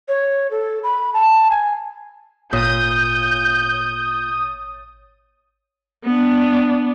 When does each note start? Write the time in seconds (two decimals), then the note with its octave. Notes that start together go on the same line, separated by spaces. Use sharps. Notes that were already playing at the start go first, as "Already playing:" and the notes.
0.08 C#5
0.51 A4
0.84 B5
1.14 A5
1.51 G#5
2.53 G#1 A#2 C#5 D#6 G6 A6
6.04 B3 D4